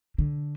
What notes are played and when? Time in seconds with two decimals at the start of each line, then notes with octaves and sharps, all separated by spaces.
0.18 D3